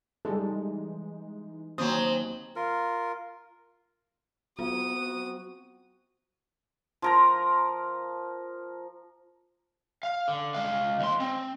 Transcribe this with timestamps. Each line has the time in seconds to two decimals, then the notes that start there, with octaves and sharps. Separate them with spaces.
0.25 E3 G3 G#3 D#4 G#4 A4
1.78 D#2 F#3 C4 G#5 B5 D#6
2.56 F4 A#4
4.59 F#3 B3 C4 F4 F#4 D#6
7.02 F3 A#4 A#5
10.03 F5
10.27 D3
10.54 G#3 F5
11.00 D#2 C6
11.20 C4